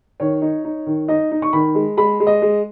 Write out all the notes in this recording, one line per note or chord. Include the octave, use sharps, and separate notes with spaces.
D#3 C#5
D#4
D#4
D#3
D#4 D#5
D#4
C#6
D#3 B5
G#3
G#3 B5
G#3
D#5
G#3